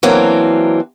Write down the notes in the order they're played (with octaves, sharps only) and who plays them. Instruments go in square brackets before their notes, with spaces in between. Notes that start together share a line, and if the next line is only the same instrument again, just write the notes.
[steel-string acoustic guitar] E3 F#3 A#3 C4 D4